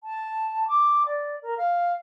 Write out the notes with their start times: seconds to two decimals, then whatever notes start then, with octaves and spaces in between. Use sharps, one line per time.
0.04 A5
0.68 D6
1.06 D5
1.42 A#4
1.58 F5